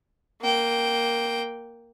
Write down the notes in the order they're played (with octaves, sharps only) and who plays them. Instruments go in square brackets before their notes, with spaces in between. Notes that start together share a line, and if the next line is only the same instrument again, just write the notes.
[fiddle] A#3 G5